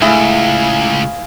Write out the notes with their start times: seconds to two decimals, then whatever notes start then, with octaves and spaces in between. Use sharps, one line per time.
0.02 C#2 A2 E4 G#4 F5